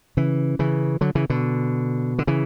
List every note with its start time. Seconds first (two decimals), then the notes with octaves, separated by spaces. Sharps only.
0.17 C#3 E3
0.59 C#3 E3
1.01 D3 F#3
1.15 C#3 E3
1.30 B2 D3
2.19 D3
2.27 C#3 E3